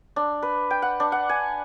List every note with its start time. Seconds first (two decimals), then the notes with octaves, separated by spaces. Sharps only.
0.16 D4
0.42 B4
0.71 G5
0.82 F#5
1.00 D4
1.12 F#5
1.29 G#5